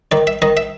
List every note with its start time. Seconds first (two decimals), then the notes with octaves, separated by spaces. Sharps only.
0.12 D#3 D5
0.27 E5
0.42 D#3 D#5
0.57 E5